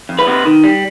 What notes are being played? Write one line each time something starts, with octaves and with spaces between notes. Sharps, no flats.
F2
B4
C3
D#3
G3